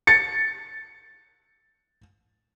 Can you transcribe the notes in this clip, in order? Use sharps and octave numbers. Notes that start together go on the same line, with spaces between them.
A6 C#7